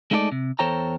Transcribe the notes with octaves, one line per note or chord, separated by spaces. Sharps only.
G#3 A3 D#4 E4 A4 D5
C3
E2 A4 C5 C#5 G5 A#5